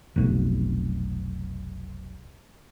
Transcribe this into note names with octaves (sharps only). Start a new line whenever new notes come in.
F1 B1